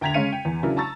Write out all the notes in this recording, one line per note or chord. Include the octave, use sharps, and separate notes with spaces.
D2 G5 A#5 G#6 B6 F7
C#3 G#3 C#4 F5 C#7 D#7
G5
E2
C#3 F#3 D4 E4 A#4
A5 A#5 C#6 E6 A6